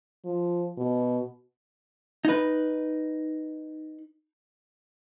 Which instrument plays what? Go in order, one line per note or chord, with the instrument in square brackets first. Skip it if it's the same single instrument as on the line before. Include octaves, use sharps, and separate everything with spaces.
[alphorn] F3
B2
[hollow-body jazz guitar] D#4 B4